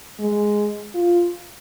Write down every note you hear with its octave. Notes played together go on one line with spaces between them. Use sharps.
G#3
F4